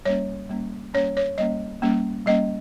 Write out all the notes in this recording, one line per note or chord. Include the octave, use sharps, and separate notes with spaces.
G3 A#3 C#4 C#5
G3 A#3 C#4
G3 A#3 C#4 C#5
C#5
G3 A#3 C#4 D#5
G3 A#3 C#4
G3 A#3 C#4 D#5